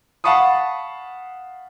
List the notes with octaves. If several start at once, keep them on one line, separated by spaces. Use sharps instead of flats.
F5 F#5 A5 B5 C#6 D#6